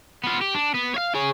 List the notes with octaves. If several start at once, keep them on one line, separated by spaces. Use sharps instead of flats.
B3 F4
G4
D4
B3
C#5 F5
G#4 C#5